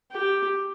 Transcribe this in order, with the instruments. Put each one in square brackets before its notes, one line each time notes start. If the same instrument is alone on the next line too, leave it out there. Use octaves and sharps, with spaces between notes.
[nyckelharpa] G4